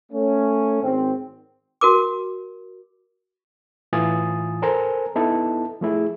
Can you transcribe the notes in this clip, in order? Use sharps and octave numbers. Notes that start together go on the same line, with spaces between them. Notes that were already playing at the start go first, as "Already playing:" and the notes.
A3 C#4
G#1 C4
F#4 A#4 D6
A2 E3 F4 G#5 D#6 A6
A4 A#4 C5 G#5 A#5
B3 D#4 E4 A4 A5
F3 A3 E4 G#4